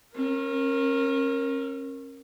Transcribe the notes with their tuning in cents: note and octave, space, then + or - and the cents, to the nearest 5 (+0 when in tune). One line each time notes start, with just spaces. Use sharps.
C#4 -35 A#4 +0